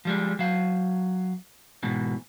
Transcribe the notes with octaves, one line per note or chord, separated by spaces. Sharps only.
F3 G3 G#3
F#3 F5
G#2 B2 E3